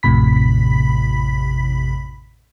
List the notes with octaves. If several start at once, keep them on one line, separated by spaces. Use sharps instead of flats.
A1 F2 A2 C3 B5 B6